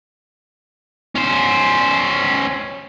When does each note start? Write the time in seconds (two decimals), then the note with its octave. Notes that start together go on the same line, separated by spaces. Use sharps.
1.16 C#4 C5